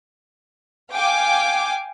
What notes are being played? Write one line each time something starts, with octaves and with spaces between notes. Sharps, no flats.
F5 G5 G#5 D6